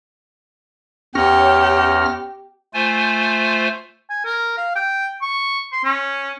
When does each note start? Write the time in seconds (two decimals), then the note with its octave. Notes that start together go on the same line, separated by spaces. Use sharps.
1.15 E2 C#4 G4 F6 A#6
2.74 A3 F4 C5 G#5
4.10 G#5
4.25 A#4
4.57 F5
4.75 G5
5.22 C#6
5.72 C6
5.84 C#4